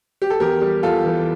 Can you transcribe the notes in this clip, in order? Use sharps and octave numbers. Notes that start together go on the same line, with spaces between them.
G4
A4
E2 G4 A#4
G3
E2 F4 A4
E3